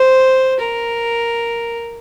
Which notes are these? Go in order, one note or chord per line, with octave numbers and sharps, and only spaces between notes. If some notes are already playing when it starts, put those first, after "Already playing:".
Already playing: C5
A#4